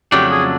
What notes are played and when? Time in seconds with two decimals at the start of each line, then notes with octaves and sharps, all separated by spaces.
0.12 F2 C#3 F#3 A3 D4 G4
0.31 G#4